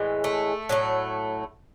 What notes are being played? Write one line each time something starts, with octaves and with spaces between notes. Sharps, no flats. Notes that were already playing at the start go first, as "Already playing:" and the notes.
Already playing: A2 E3 G#3
A3
A2 F#3 A3